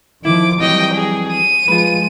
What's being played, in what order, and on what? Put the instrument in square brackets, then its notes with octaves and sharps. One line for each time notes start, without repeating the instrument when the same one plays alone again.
[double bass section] D#3 F3 [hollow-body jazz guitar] E4 [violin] D6
[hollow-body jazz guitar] F2 E3 F#3 [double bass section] G3 [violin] D#5 G5
[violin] G#4
D#7
[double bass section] F3 G#3 [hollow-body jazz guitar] F4 B4